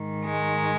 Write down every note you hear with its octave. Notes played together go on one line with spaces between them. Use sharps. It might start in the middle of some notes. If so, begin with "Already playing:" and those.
Already playing: G#2 D#3
G#3